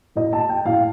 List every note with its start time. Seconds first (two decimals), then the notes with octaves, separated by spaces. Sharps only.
0.16 A2 D#5
0.33 A5
0.49 G5
0.65 A2 F5